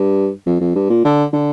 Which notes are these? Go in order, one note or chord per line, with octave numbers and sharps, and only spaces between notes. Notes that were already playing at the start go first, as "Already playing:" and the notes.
Already playing: G2
F2
F2
G2
A#2
D3
D3